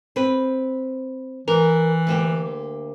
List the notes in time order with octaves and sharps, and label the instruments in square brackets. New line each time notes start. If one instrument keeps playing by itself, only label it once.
[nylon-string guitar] C4 B4
[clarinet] E3 [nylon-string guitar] A#4
[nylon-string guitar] D2 A#3 G4